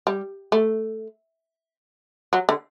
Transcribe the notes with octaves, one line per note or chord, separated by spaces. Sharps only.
G3
A3
F#3
D3